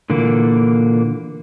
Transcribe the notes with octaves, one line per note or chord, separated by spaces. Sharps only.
A#2 D3 E3 A#3